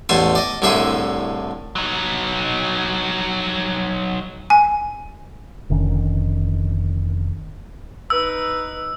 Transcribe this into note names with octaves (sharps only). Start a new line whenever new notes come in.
A1 E2 A3 G#5 A5 C6
D5 D#5
C2 A2 D3 G#4 E5 C6
F#3 D#4
G#5
F1 D3 D#3 C#4
D#4 B4 E6